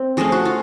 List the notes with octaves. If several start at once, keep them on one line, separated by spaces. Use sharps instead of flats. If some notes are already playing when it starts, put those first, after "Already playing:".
Already playing: C4
F3 A3 C#4 G#4
F#4
F4